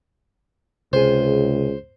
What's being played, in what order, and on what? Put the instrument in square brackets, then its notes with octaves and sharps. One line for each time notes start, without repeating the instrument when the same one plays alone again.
[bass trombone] C#2 [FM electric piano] C3 G#4 [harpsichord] C5